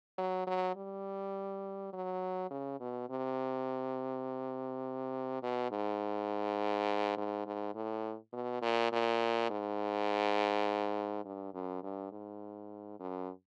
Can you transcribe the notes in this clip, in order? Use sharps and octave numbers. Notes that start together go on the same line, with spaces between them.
F#3
F#3
G3
F#3
C#3
B2
C3
B2
G#2
G#2
G#2
A2
B2
A#2
A#2
G#2
G2
F#2
G2
G#2
F#2